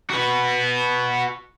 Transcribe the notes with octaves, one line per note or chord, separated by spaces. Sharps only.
F#4 B4